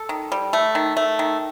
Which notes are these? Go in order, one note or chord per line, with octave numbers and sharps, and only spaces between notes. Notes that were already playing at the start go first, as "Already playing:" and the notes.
Already playing: A4
D#3
G3
A3
D#3
A3
D#3